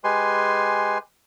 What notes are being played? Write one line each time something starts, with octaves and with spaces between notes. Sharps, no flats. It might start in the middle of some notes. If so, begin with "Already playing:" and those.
G#3 G4 B4 G#5 C6